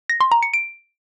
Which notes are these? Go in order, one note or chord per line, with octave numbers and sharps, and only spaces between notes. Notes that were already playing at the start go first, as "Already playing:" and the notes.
A#6
C6
A#5
C#7
D7